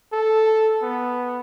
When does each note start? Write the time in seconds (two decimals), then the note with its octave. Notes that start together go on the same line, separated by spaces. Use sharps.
0.13 A4
0.82 B3